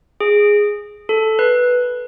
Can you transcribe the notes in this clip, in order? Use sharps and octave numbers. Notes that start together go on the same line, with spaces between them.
G#4
A4
B4